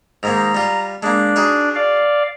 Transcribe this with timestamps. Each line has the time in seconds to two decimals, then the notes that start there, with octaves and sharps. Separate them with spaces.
0.23 G#2 D#3 A#3 A#5
0.55 G3 F4
1.03 G#3 A#3 D4
1.36 D#4 F#4 G#4
1.75 D5 F5